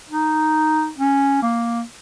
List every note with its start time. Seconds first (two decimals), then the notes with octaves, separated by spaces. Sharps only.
0.10 D#4
0.98 C#4
1.42 A#3